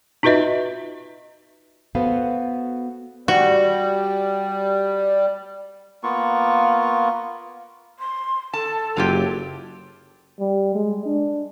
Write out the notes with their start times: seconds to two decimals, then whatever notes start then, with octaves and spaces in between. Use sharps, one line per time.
0.23 D#4 F4 F#4 B4 D#5 E5
1.95 B3 F#4 A4 B4 C5 F5
3.28 G3 F#4
6.03 A#3 B3 F4 C#6
7.99 C6
8.54 A4 A5
8.97 F#1 F#3 F4 G4
10.40 G3
10.75 G#3
11.05 D4